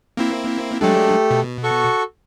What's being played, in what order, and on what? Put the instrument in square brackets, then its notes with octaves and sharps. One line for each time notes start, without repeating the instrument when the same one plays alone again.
[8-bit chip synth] A#3 C4 E4
[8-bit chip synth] F#3 G#3 D4 [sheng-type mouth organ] A3 G4 A4
[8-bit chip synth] B2
[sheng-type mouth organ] F#4 A4 C#6